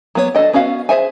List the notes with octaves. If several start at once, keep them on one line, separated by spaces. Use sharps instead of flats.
F#3 A#3 B3 D4 C#5
D4 F#4 A4 D#5 G5
B3 C#4 F#4 F5
G#4 C5 E5 G#5